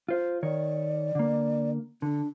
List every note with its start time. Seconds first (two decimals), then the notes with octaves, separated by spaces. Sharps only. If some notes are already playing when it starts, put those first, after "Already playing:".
0.09 F4 C5
0.43 D#3 C#5 D5
1.15 D3 A#3
2.02 D3 D4